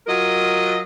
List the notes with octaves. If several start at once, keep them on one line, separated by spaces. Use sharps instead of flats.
F#3 F4 A#4 D#5